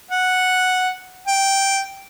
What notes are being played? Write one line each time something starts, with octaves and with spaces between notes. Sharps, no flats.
F#5
G5